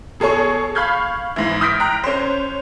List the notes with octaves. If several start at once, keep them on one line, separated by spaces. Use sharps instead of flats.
B2 G#4 A4 C#5 C#6
F5 B5 C#6 F6 G6 G#6
G#2 E3
D#6 F6 G6 A#6 B6 D7
G5 A#5 F#6
C#4 C5